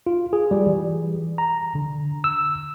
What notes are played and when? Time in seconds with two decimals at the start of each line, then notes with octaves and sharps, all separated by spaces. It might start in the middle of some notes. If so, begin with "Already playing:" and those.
0.07 F4
0.33 G#4
0.51 G3
0.67 E3
1.38 A#5
1.75 D3
2.24 E6